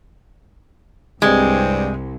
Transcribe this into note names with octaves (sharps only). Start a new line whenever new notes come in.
C2 G2 G3 G#3 C4